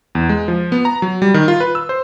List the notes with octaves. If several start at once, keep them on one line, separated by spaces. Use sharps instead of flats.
E2
G#3
F3
B3
A#5
F#3
G3
D#3
F4
B4
E6
C5